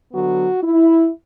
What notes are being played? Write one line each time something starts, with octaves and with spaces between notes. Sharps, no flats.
D3 F#3 B3 F#4
E4